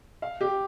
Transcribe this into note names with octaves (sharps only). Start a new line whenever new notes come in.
F5
G4